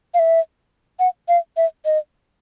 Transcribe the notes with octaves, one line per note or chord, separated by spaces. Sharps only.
F5
E5
F#5
F5
E5
D#5